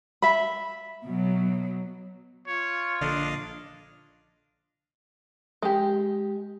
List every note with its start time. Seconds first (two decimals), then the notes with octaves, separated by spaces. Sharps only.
0.22 E5 B5
1.04 B2 F#3
2.47 F4 C#5
3.01 A#1 D3 D4 D#5 F5
5.62 G#3 G4